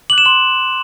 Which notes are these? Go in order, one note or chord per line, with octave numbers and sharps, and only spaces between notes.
D6 F#6 F#7
E7
C6 F#7